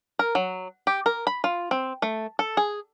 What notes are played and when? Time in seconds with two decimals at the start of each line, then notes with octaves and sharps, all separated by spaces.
0.19 A#4
0.35 F#3
0.87 G4
1.06 A#4
1.27 B5
1.44 F4
1.71 C4
2.02 A3
2.39 A4
2.57 G#4